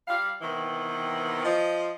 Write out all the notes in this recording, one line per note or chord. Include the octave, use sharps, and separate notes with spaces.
G3 F5
C3 D#3 E3 B3
F3 D#5